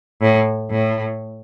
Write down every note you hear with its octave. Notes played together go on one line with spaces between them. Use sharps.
A2
A2